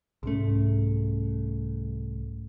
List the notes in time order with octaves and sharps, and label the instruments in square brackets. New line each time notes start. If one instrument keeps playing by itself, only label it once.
[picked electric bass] C2 A3 [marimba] G#2 C#4